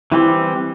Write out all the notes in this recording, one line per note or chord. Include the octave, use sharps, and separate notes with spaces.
E3 G3 C4 E4